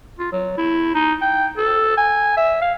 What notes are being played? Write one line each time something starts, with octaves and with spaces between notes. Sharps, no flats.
F4
F#3
E4
D#4
G5
A4
G#5
E5
F5